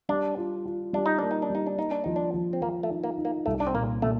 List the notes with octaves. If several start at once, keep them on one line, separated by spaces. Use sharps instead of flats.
G3 D4
F4
F4
G3 D4
D#4
A#3 D4
D#4
D4
G3 D#4
D4
A#3 D#4
D4
F3 D#4
D4
F3
C4
F3 A#3
A3
D#4
A#3
D#4
A#3
C2 A3
D4
C4
A#2 A#3
A#2 A3